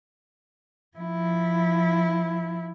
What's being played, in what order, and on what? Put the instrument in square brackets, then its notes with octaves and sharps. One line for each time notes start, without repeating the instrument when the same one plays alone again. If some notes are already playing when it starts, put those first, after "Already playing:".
[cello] F3 E4